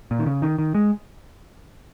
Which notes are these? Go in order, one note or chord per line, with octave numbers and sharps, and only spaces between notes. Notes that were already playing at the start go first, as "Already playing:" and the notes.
A#2
D#3
C#3
D#3
D#3
G#3